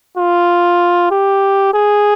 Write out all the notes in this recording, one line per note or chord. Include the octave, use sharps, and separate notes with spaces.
F4
G4
G#4